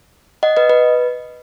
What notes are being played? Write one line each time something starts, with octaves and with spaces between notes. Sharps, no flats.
D#5 F#5
B4 D#5
B4